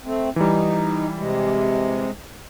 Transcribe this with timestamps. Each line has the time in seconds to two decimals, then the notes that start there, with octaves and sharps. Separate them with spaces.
0.04 A3 C4
0.36 E3 G3 D#4
1.17 C3 G#3